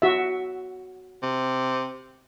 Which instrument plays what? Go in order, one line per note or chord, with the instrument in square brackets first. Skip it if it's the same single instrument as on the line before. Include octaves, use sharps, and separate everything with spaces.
[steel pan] F#4 E5
[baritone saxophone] C3